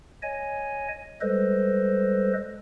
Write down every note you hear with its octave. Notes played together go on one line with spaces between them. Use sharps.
C#5 D#5 G#5
G3 G#3 A4 B4 C5 D#5